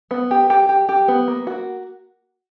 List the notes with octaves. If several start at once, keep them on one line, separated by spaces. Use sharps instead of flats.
B3
G4
G4
G4
G4
B3
A#3
F#4